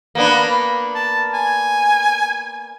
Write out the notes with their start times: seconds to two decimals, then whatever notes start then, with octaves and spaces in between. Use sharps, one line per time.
0.15 A#3 B3 D4
0.95 A5
1.34 G#5